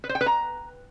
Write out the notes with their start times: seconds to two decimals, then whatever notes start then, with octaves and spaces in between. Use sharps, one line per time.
0.04 B4
0.09 C5
0.15 G5
0.21 B4
0.26 A#5